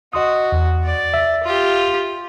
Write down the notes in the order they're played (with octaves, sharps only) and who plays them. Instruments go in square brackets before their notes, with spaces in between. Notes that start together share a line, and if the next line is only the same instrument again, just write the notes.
[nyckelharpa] F#4 [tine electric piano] D#5 C6 D#6
[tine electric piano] E2
[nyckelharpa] D5
[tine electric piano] E5
[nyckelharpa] F4 G4